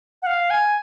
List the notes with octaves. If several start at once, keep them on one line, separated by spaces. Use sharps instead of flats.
F#5
F5
G#5